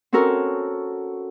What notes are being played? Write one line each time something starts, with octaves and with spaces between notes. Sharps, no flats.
C4 C#4 F#4 A4 A#4